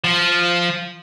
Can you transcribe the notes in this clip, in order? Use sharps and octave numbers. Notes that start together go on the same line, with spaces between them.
F3